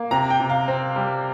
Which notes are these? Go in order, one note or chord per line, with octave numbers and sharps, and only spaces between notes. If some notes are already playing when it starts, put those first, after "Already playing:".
Already playing: A#3
C3 A#5
G5
C3
F5
C4
G3